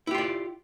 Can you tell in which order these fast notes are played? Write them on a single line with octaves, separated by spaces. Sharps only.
E4 G4 F4 D5